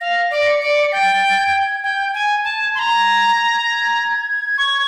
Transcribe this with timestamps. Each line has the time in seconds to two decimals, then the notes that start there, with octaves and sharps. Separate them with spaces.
0.01 F5 A#6
0.31 D5
0.47 C#7
0.61 D5
0.92 G5 A6
1.38 G#6
1.83 G5 G#6
1.97 G6
2.09 G#6
2.14 G#5
2.44 A5
2.75 C6 G#6
2.79 A#5
3.66 G#6
4.58 C#6